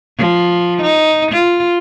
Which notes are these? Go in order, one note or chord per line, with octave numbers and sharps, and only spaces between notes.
F3
D#4
F4